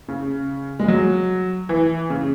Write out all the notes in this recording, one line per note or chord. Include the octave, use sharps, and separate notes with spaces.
C#3
G#3
F#3
E3
C#3